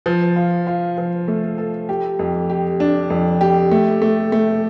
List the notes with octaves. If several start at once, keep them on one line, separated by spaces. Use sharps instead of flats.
F3
F4
F4
F3
A3
A4
G4
F2
G4
D4
F2
G4
A3
A3
A3